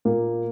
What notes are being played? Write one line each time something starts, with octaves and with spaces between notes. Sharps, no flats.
A#2 A#3